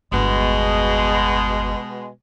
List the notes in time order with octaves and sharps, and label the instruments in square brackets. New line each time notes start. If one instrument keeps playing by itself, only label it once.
[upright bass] G1 E2 [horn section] B2 G#3